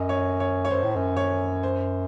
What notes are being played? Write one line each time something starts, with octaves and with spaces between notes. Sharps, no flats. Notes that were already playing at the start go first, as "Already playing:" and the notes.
Already playing: F#2 D#5
C#5
C#5
C#5
F#2 C5
A2
F#2
C#5
C5